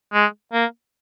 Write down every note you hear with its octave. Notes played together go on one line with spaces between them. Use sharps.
G#3
A#3